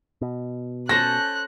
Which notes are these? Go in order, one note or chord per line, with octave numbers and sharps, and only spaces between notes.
B2
C#4 A4 C5 F#6 A#6